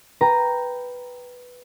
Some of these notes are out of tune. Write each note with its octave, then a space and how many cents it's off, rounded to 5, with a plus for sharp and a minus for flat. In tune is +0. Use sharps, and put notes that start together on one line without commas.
B4 +0 G5 +0 A#5 +0